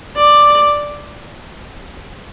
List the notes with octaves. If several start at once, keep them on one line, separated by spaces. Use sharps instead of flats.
D5